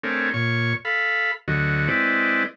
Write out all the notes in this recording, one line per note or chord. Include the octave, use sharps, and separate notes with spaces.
A3 C4 D4 G#4 A#4 C#5
A#2 C#5 C#6
A4 F5 B5
D2 D3 F#3 F#4 D#5
G#3 C4 E4 B4 D5 D#5